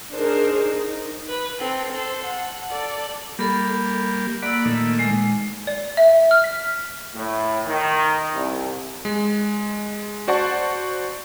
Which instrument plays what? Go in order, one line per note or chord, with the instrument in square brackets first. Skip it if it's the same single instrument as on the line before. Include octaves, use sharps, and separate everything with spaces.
[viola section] D4 D#4 G#4 A#4 C5
D#4
[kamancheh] B4
C4 A4
A4 C5
F#5
A4 D5
[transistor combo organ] G3 A#3 [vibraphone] A4 B5
[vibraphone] A#3 E6 [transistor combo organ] D5 F#5 B5
[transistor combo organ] A#2 D#3 A3
[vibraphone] G#3
[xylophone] D5
E5
F6
B6
[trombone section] A2
D#3
C2
[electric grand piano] G#3
F#4 C5 D5 F#5 A5 C#6